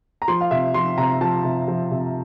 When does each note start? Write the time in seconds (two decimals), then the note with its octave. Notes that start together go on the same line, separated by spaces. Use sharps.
0.22 A#5
0.28 F3 C6
0.41 F5
0.51 C3 E5
0.74 F3 C6
0.98 C3 A#5
1.21 F3 A5
1.44 C3
1.68 F3
1.91 C3